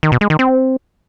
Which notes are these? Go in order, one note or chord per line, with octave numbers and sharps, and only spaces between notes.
D#3
B2
G#3
D#3
C4